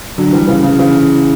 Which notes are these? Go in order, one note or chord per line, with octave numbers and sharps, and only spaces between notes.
D3 F#3
E3 G3
C#3 E3
C#3
C#3 E3